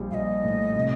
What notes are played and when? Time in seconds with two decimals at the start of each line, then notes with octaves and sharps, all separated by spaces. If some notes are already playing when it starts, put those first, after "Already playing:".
Already playing: A#1 G3
0.11 A#1 D#5 F5
0.44 A2
0.75 C3